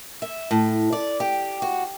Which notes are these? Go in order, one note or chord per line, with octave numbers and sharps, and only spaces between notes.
E5
A2
D5
G4
F#4